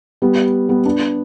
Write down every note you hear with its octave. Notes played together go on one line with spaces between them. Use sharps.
G3 B3
G3 B3
B3 D4